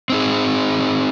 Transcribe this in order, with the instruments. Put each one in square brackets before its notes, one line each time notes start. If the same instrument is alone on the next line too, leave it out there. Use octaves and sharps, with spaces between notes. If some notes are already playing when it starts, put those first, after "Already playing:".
[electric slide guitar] C4 D#4 G#4